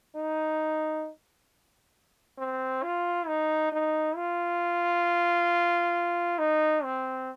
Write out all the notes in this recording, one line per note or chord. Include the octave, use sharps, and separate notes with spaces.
D#4
C4
F4
D#4
D#4
F4
D#4
C4